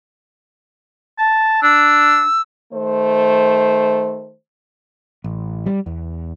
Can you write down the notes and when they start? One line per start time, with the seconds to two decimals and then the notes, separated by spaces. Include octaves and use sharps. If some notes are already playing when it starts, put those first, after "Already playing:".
1.18 A5
1.62 D4 E6
2.73 D#3 A3 C5
5.24 A1
5.66 G3
5.86 E2